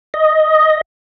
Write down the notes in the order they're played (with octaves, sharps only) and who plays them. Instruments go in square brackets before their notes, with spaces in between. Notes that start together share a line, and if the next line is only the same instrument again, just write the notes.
[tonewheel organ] D#5